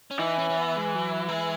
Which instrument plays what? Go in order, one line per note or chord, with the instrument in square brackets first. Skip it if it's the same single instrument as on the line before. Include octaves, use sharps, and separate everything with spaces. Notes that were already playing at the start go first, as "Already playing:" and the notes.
[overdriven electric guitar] C#4
[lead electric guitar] E3 [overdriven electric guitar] D#4
[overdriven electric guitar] C#4
C#4
B3
G#3
F#3
A#3
G#3